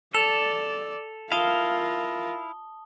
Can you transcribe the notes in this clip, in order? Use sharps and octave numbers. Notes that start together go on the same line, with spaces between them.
A4 D5 F7
E4 F4 A#4 F5 A5 D#6 G7